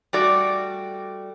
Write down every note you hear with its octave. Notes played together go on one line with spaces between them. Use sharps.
G3 A3 F#4 D5